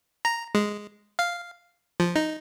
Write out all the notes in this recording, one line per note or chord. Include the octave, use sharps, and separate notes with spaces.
A#5
G#3
F5
F3
D#4